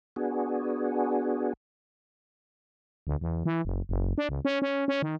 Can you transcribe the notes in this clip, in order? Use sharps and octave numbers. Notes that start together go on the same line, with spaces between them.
B3 D4 F#4 G#4
D2
E2
E3
F#1
F#1
D4
C#2
C#4
C#4
C#4
D#3